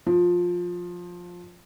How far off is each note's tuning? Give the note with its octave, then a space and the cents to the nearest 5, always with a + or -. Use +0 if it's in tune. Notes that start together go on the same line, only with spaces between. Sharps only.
F3 +15